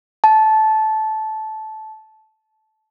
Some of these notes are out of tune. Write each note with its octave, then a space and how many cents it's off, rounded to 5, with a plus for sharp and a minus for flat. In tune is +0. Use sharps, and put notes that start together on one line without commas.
A5 -15